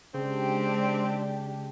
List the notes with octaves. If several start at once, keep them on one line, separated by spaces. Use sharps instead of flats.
C#3 G#3 C4 D4 G4